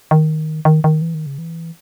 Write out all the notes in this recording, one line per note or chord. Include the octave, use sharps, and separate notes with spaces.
D#3
D#3
D#3
E3
D#3
C#3
E3